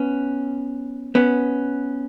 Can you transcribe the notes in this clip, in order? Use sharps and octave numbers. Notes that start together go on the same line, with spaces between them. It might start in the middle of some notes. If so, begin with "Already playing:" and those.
Already playing: B3 C#4
B3 C#4